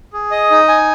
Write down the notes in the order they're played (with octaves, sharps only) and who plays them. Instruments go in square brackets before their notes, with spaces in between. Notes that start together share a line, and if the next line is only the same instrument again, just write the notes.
[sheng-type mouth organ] G#4
D#5
D#4
G#5